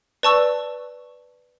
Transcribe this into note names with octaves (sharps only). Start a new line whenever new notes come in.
B4 D5 A5 C#6 E6